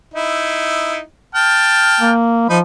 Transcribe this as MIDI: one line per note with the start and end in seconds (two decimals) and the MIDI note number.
0.14 1.01 63
0.14 1.01 64
1.35 2.11 79
1.35 2.11 81
1.35 2.11 89
2.00 2.49 58
2.49 2.61 53
2.49 2.58 63
2.49 2.58 83